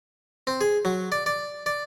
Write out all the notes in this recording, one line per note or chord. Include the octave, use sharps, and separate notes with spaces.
C4
G#4
F#3
D5
D5
D5